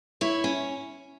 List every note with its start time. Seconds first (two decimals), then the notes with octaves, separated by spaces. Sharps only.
0.21 E4 C#5
0.44 C#4